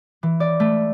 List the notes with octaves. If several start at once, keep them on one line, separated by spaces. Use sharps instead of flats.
E3
D5
A3